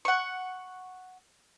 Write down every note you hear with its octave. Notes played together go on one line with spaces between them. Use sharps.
F#5 C#6